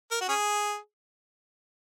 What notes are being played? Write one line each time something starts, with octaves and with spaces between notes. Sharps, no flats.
A#4
F#4
C#4 G#4